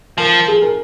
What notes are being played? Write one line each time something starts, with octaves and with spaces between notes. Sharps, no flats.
F3 A#4
G#4
A#4